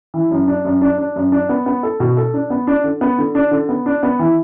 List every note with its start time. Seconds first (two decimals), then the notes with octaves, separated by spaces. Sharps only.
0.14 E3
0.31 F#2
0.48 D4
0.65 F#2
0.81 D4
0.98 D4
1.16 F#2
1.32 D4
1.49 B3
1.66 B3
1.83 A4
2.00 B2
2.17 A4
2.34 D4
2.50 B3
2.67 D4
2.84 D3
3.01 B3
3.18 D3
3.35 D4
3.51 D3
3.69 B3
3.86 D4
4.03 B3
4.19 E3